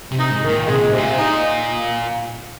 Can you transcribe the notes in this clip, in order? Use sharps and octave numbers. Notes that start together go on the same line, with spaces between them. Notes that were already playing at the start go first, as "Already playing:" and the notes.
C3
D#4
G#2
D#3
A#2
C3 G#3
A#2
G#2 C3
A#2
D#4